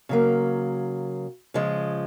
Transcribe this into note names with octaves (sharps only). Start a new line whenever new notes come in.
C#3 F#3 A#3
C#3 F3 G#3